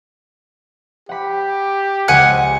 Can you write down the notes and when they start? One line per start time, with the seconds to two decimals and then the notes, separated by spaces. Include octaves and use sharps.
1.09 G4 F#5 B5
2.08 C#2 C#3 F#5 G#5 F#6